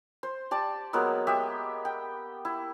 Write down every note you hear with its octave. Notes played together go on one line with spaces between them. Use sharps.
C5
G4 D5 A5
F#3 G#3 A#3 B3
G#3 G4 E5
G5
E4